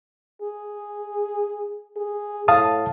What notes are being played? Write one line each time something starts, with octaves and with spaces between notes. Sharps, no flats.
G#4
G#4
A2 F5 A5 D#6